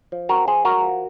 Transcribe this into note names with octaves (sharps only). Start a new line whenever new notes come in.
F3
C4 F#4 A#4
F3 G#4 C5
G#3 F#4 A#4
F3